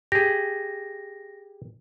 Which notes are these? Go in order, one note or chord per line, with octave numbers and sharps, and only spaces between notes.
G4 G#4 A#6